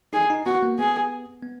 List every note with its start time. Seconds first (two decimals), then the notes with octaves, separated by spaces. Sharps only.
0.13 D#4 G#4
0.30 D#4
0.46 B3 F#4
0.63 A#3
0.79 B3 G#4
1.43 B3